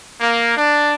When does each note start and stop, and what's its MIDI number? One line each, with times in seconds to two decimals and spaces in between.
0.21 0.54 58
0.57 0.95 62